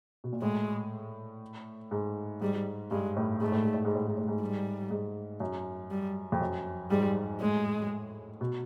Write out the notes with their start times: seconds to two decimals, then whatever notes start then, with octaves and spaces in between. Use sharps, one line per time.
0.24 B2
0.32 A#2
0.42 A2 G#3
1.91 G#2
2.41 G#2 G3
2.91 G2 G#3
3.16 A2
3.41 G#2 A3
3.52 A2
3.64 G#2
3.74 A2
3.85 G#2
3.95 A2
4.07 G#2
4.17 A2
4.28 G#2
4.41 G3
4.90 G#2
5.40 F#2
5.91 G3
6.32 F2
6.41 F#2
6.90 G#2 G3
7.40 A2 G#3
8.41 B2